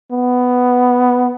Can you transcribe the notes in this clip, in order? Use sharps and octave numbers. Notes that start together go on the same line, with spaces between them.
B3